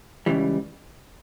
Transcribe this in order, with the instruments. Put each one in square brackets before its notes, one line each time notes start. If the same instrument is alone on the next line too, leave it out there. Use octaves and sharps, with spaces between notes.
[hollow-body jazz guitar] C#2 C#3 E3 G3